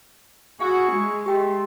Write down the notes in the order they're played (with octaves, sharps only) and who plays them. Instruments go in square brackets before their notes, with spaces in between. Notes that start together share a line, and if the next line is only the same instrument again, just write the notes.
[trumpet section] E4 G#4 C#6 [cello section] F#4 [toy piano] F5
[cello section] G#3
[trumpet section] A3 C6 [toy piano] G4 G5